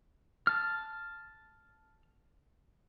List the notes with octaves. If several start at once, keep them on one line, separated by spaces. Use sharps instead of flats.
A5 F6